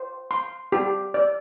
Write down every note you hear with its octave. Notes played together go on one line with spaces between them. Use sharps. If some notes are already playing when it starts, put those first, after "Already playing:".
Already playing: C5
C6
G4
D5